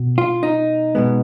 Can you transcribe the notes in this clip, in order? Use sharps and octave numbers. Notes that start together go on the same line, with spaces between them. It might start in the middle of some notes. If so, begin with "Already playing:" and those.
Already playing: B2
F4
D#4
B2 G#3 B3